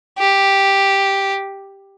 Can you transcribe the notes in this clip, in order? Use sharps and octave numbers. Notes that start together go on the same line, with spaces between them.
G4